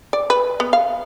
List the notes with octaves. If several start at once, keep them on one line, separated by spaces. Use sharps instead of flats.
D5
B4
B3
F5